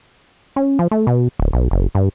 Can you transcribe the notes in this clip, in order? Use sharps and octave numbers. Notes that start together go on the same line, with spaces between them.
C#4
F3
A3
B2
D1
B1
F#1
G2